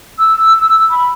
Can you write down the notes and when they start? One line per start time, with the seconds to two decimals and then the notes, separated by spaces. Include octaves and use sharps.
0.19 E6
0.89 B5